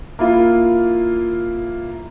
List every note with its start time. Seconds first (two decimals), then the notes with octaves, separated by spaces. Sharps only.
0.19 A#3 E4 F4